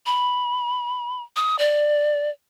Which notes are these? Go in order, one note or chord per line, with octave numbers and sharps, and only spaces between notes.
B5
D#6
D5